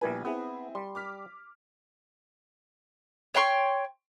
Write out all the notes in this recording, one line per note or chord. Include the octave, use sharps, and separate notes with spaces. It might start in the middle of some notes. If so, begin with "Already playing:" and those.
A#1 G3 B3 E4 B4 G#5
B3 C4 E4 G#4
G3 C6
D6 F6 B6
C#5 G5 C6 C#6